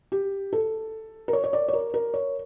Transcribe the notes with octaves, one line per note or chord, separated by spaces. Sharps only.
G4
A4
A#4
C#5
C#5
D5
C#5
A#4
A#4
C#5